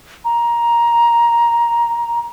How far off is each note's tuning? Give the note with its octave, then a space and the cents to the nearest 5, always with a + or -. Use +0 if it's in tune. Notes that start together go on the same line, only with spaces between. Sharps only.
A#5 +10